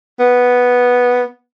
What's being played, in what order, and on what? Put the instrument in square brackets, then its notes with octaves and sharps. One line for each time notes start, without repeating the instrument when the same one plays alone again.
[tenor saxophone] B3